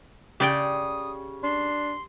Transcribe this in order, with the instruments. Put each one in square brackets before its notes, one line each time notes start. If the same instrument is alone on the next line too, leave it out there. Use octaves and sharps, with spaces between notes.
[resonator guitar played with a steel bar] C#3 [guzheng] G4 D5 G5 [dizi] D#6
[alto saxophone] D4 [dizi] C6